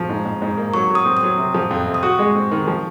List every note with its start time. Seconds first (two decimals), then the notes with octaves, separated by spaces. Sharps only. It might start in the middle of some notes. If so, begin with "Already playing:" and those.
Already playing: F3 C#6
0.09 G#2
0.25 G#2
0.42 G#2
0.57 A#3
0.74 F#3 C#6
0.90 F#3 D#6
1.06 C4
1.17 D#6
1.23 F#3
1.38 C3
1.54 F3
1.71 F2
1.87 C3
1.94 D#6
2.03 F#4 C#6
2.19 G#3
2.35 C4
2.51 D#3
2.67 F3